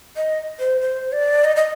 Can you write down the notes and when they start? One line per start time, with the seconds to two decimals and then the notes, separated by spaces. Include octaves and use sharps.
0.17 D#5
0.59 C5
0.81 C5
1.12 D5
1.44 D#5
1.56 D#5